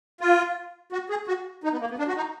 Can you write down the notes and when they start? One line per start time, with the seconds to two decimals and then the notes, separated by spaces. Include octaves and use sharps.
0.21 F4
0.92 F#4
1.10 G#4
1.27 F#4
1.64 D#4
1.72 B3
1.80 A#3
1.90 B3
1.99 D4
2.08 F#4
2.17 D#4